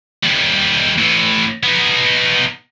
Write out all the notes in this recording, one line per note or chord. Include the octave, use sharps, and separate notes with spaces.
D#2 G3
A2 E3
B3 D#4